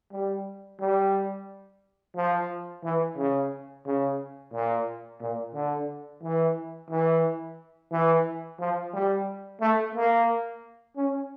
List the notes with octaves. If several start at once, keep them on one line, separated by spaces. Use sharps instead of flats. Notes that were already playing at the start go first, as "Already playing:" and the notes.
G3
G3
F3
E3
C#3
C#3
A#2
A#2
D3
E3
E3
E3
F3
G3
A3
A#3
C#4